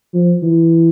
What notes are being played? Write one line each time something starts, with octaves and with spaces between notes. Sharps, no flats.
F3
E3